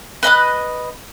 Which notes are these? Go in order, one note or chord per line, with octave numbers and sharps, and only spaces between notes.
B4 D#5 B5 F#6